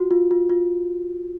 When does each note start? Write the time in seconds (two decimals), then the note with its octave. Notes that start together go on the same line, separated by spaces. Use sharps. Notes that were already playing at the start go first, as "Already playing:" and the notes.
Already playing: F4 F#4
0.11 F4
0.31 F4
0.50 F4